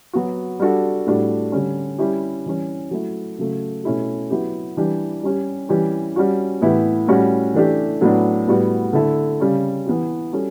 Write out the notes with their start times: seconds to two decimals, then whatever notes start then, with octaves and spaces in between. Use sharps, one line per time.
0.13 F#3 B3 F#4
0.60 G3 D4 F#4 A4
1.06 A2 G3 D4 F#4 A4
1.52 D3 G3 C#4
1.98 G3 C#4 E4 G4
2.46 E3 G3 C#4
2.91 F#3 A3 E4
3.38 C#3 F#3 A3
3.84 B2 A3 C#4 E4 G4
4.30 F#3 B3 E4 G4
4.77 E3 G3 D4 G4
5.23 G3 C#4 G4
5.69 E3 G3 C#4 G4
6.16 G3 C#4 F#4
6.61 A2 E3 B3 E4 G4
7.08 A2 G3 C#4 F#4
7.54 E3 A3 D4 G4
8.01 A2 F#3 B3 D4
8.48 A2 G3 B3 F#4
8.93 D3 A3 E4 A4
9.40 C#3 G3 C#4
9.86 E3 B3 E4 G4
10.32 G3 C#4 F#4 A4